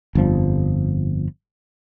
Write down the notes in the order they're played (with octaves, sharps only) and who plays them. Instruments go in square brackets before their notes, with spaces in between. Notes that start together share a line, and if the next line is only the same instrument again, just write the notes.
[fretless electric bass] G1 F2 F3 G3